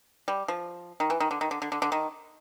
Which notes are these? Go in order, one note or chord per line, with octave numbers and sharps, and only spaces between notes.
G3
F3
D#3
E3
D#3
D3
D#3
D3
D3
D3
D3
D#3